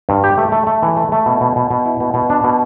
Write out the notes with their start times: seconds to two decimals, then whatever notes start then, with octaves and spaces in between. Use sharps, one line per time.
0.09 G2
0.24 G4
0.38 A3
0.52 A3
0.67 A3
0.82 E3
0.97 A3
1.12 A3
1.26 B2
1.41 B2
1.56 B2
1.71 B2
1.86 E4
2.00 B2
2.14 B2
2.30 D4
2.44 B2